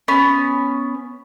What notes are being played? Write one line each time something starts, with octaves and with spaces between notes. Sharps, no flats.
B3 C#4